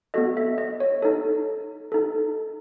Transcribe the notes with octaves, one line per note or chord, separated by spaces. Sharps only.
B3 F#4 A4 D#5
E5
D#5
C#5
D#4 A4
D#4 A4